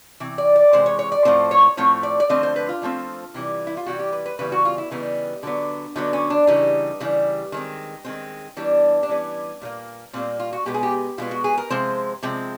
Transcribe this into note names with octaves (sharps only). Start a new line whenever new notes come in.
C3 E3
D5
D5
C3 E3 G#3 C5
C#5
C#5
D5
A2 F3 A3 C4 C5
C#5
A2 F3 A3 C4 C#5
D5
D5
D3 F3 A3 C4 D#5
C5
B4
F4
D3 F3 A3 C4
C3 E3 G3
E4
F4
C3 E3 G3 F#4
G4
B4
B4
C#3 E3 G3 B3 B4
F#4
F4
E4
C#3 E3 G3 B3 D#4
D3 F#3 B3
D3 F#3 B3 D#4
C#4
D4
C#3 E3 G3 D#4
C#3 E3 G3
D#3 G#3 C4
D#3 G#3 C4
E3 G3 B3 D4
D4
E3 G3 B3 C#4
A#2 G3 A#3
A#2 G3 A#3 C4
F4
F#4
B2 G#3 B3 G4
G#4
G4
B2 G#3 B3 F4
F#4
G#4
A#4
C3 F3 G#3 C4 C5
C3 F3 G#3 C4